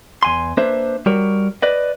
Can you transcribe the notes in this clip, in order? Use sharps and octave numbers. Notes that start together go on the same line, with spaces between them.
E2 G#5 C6
A#3 D4 B4 C5 E5
G3 F#4 A#4 C#5
B4 D5 D#5